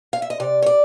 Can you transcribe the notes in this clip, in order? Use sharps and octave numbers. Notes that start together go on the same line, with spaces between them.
F5
E5
D#5
C3 D5
C#5
D5